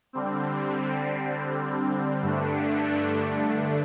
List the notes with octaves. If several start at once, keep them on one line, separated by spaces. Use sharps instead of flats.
D3 G3 C4
G2 D3 A3 D4